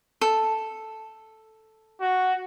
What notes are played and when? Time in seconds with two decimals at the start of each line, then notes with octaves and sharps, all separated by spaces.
0.21 A4
2.01 F#4